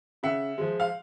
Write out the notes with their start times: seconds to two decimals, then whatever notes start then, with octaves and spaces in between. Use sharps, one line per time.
0.23 C#3 E5 F#5
0.58 F3 G#3
0.80 F5